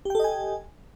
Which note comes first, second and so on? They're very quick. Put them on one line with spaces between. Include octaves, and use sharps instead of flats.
G4 G5 A4 D#5 G#5